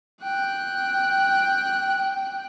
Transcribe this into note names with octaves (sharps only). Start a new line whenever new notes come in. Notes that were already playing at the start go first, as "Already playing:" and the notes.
G5 F#6